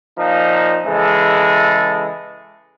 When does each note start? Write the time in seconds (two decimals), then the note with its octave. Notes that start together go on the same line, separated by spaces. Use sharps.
0.18 A#2 F3 D#4
0.86 C#3 E3 G#3 A4